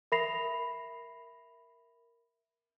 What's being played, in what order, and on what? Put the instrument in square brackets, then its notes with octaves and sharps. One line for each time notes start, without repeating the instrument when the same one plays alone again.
[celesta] A#4 E5 B5 A#6 C7 F7